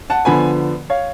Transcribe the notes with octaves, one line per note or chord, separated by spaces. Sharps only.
F#5 A5
D3 F3 B3 G#5 B5
C#5 F5